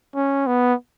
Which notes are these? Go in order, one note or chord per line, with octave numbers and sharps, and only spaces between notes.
C#4
B3